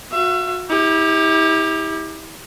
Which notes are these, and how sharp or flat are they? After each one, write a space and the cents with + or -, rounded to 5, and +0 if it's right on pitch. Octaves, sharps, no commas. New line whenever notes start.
F#4 -30 E5 +35
E4 -35 G4 +20